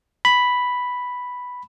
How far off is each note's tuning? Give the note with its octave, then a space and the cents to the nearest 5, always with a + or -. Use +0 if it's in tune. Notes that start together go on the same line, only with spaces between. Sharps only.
B5 +0